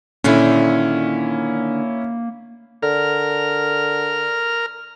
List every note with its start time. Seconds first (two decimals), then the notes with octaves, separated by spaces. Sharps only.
0.24 A#2 D3 D#3 A#3 C#4 E4
2.83 D3 A#4 F6